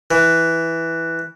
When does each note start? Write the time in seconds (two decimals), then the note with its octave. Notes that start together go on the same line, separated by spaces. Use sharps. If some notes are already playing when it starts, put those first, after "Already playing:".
0.11 E3